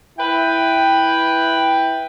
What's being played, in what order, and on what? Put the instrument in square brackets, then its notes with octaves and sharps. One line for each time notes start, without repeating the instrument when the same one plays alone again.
[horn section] E4 B4 G5